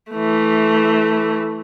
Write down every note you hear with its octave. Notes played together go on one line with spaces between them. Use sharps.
E3 A3